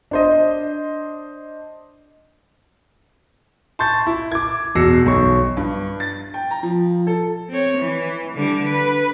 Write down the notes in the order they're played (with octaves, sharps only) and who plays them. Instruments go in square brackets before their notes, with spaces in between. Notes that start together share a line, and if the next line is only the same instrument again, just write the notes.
[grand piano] D4 C5 D#5
A5 C6 C#6 G6 A6
E4
D6 G#6
E2 B2 E6 A#6 C7 C#7
B1 C#6
[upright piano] G2
A6
G5
A#5
F3
A4
[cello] C4 C#5
E3
D3 G3
B4